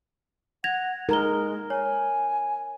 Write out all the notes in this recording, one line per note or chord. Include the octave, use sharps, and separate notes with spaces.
F#5 G#6 A#6 F7
G#3 D#4 A#4 A#5 G7
C#5 G#5